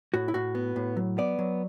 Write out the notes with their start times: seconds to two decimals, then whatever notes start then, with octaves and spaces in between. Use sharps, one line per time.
0.14 A2 F#4
0.28 E4
0.34 A2 F#4
0.55 B3
0.76 A2
0.97 F#3
1.18 B3 D5
1.39 F#3